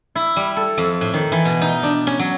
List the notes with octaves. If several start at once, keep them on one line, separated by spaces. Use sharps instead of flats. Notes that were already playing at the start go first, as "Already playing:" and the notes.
E4
G3
A4
F2
A2
D#3
E3
B2
D#4
D4
C#4
F#3